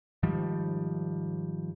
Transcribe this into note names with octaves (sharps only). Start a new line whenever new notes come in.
G#2 D#3 F3 G3